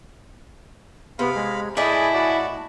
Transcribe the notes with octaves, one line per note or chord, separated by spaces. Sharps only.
C3 B3 F5 B5
G#3
A2 E4 G#4 D5 D#5 G#5
F#4 D5